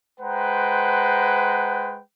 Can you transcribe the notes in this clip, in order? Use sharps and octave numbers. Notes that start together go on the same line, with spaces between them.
G#3 B4 C5 F#5 G5 A#5